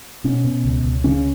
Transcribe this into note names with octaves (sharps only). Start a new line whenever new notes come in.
B2 C#4
B2
C#2
C#2
C#3 C#4